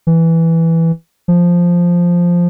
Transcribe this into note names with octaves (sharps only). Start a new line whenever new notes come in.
E3
F3